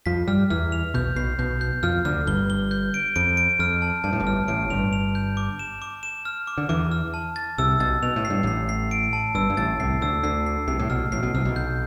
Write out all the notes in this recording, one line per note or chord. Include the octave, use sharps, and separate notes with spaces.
F2 F3 B6
G2 G3 F6
E2 E3 F6
F7
B1 B2 G6
B1 B2 C7
B1 B2 G6
G6
F2 F3 F6
D2 D3 F6
G1 G2 G7
G7
G6
D7
F2 D7
D7
F2 F6
A5
G2 A5
A2
G1 G2
F6
A1 A2 D7
G1 G2 F7
F7
G6
D6
E7
D6
E7
F6
D6
D3
E2 E3 D6
F6
A5
A6
C2 C3 E6
B1 B2 A6
B2 F7
A2
C7
G2
A1 A2 C7
C7
D7
A5
G1 G2 E6
G2
A1 A2 A6
C2 C3 C7
D2 D3 E6
D2 D3 C7
C7
C2 C3 C7
A2
B1 B2 F6
A1 A2 C7
B1 B2
C2 C3 F6
B1 B2
G6